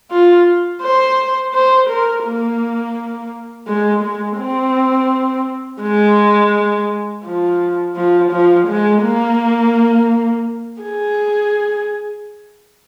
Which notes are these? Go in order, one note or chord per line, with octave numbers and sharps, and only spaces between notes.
F4
C5
C5
A#4
A#3
G#3
G#3
C4
G#3
F3
F3
F3
G#3
A#3
G#4